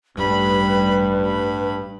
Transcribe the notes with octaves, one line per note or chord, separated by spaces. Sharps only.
A1 G2 G3 B4 B5
B5